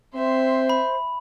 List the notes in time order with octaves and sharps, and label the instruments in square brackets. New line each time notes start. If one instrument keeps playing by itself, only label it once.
[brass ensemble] C4 [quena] C5 [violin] E5 C6
[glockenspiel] B5